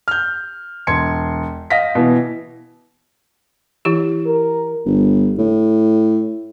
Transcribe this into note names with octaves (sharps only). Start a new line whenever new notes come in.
F6 G6
E1 C6 G#6 C#7
D#5 F5 A#6 B6
B2 E3
E3 E4 G4
A#4
G1
A2